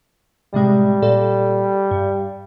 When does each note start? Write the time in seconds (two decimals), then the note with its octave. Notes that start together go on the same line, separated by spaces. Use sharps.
0.54 A2 C3 G3 G#3
1.02 A#2 A4 D5
1.91 G2